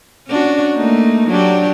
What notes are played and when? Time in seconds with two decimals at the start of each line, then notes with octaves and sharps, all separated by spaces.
0.27 C#4 D4 F#4
0.74 A3 A#3 D#4
1.28 F#3 D4 G4